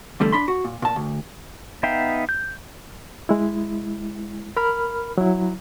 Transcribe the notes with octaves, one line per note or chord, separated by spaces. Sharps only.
E2 D3 G3 A3
D4 B5 C6
F#4
A#2
A#2 A5
D2
B3 D#4 E5 F5 G5
G6
G#3 E4
A#4 B5 F6
F#3 E4